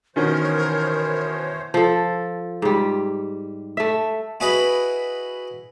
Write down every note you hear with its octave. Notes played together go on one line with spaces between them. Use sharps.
B2 D#3 E3 C#4 A#4 C5 C#5
F3 A4
G#2 G3
A3 E5
E4 F#4 G#4 B4 D#5 B5